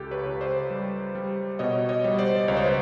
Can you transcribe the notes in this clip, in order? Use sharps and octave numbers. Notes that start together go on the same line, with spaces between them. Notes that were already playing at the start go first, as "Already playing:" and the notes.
Already playing: C#2 G4 A4
B4 C#5
C#2
C5 D5
G3
G3
B2 C#5 D#5
C#5 D#5
G3
C5 D5
C#2 C#5
C5
B4